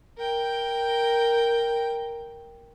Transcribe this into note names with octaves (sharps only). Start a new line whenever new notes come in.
A#4 G5